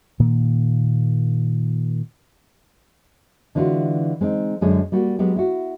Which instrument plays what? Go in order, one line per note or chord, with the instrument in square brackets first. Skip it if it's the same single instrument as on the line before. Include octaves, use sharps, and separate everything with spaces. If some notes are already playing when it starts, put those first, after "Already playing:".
[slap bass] A#2 D#3 A#3
[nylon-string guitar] D3 E3 G#3 F4 F#4
G#3 C4 D4 D#4
F#2 D3 G#3 G#4 C#5
G3 A#3 F#4
F#3 G#3 B3 G4
E4 F#4